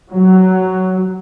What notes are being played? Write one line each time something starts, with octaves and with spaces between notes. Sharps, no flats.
F#3